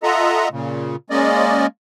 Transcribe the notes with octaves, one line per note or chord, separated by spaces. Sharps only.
F4 A4 D#5 E5 F#5 A#5
A#2 C#3
G#3 A#3 C#4 D5 D#5